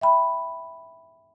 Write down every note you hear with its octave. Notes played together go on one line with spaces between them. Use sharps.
E5 G5 B5